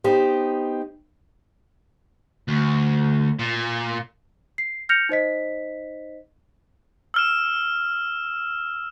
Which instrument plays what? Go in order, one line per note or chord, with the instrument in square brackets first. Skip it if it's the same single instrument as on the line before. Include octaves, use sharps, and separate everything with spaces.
[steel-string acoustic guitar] B3 D#4 G4 C5
[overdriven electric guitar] D2
A#2
[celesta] C7
F6 G6 A#6 C#7 F7
D#4 C5 D#5 B6
[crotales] E6 F6 E7